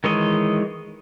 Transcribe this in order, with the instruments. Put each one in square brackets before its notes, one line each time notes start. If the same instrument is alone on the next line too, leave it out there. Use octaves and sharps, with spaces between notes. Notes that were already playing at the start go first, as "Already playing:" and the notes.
[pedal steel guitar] D#3 E3 G#3 C#5 D#5